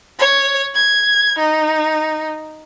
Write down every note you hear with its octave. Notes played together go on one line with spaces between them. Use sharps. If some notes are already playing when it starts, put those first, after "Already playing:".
C#5
G#6
D#4